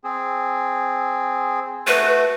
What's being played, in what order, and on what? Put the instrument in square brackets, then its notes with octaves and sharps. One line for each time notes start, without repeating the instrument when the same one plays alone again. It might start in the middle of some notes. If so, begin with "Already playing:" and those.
[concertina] C4 G#4
[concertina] A3 F#4 [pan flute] B4